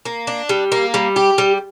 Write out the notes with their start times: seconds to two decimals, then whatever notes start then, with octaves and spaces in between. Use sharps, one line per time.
0.05 A#3
0.27 D4
0.49 G3
0.72 A#3
0.94 G3
1.16 G4
1.38 G3